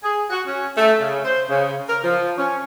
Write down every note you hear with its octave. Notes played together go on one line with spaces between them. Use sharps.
G#4
F#4
C#4
A3
C#3
C5
C#3
A#4
F3
C#4